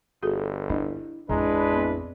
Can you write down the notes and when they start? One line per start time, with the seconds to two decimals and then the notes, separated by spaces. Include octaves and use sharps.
0.22 G1 F#4 G#4 A4
0.70 D4 E4 D#5
1.29 A1 F2 G#3 D4 E4 B4 A#5
1.73 B3 C4 B5